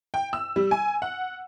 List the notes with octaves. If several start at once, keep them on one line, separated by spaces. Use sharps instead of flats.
G5
E6
G3
G#5
F#5